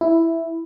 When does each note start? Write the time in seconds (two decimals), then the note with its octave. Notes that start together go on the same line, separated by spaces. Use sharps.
0.01 E4